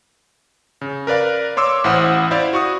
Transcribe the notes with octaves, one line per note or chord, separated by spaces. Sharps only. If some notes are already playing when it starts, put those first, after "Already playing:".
C#3
A#4 B4 D5 F5
C#5 C6 D6 E6
A1 E4 C5 F#5 D#6
E4 C5 D5 E5 F5
F#4 C#6 D#6